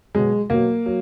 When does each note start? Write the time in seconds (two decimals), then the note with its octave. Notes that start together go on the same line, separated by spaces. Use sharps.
0.15 B2 F#3 G#3
0.50 B2 F#3 A#3
0.86 F#3